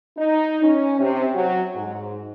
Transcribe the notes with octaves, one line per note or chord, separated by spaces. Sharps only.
D#4
C#4
C3
F#3
G#2